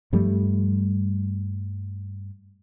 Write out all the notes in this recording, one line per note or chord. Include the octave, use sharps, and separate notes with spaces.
G2 F3 G3 A3